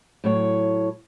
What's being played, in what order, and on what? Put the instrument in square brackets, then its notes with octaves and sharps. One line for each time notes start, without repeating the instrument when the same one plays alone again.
[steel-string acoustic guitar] A2 F#3 C#5